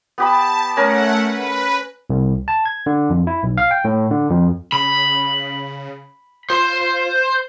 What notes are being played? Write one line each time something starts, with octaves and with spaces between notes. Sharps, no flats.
B3 G4 A5 B5
A3 C#4 A#4 F#5 G#5
B4
C2
A5
G#6
D3
F2
E4
B1
F5
G5
A2
D3
F2
C#3 B5
F4 C5